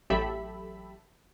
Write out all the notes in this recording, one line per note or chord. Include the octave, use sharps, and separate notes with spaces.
A1 F#3 G4 A4 E5 B5